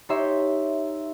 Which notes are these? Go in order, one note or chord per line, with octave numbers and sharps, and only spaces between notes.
D#4 G4 C#5 E5 C6